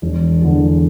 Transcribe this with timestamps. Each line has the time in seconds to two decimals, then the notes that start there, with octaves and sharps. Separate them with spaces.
0.02 E1
0.42 E2 D3